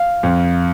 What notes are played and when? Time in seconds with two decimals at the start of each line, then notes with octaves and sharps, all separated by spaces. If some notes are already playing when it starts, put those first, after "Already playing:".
Already playing: F5
0.23 F2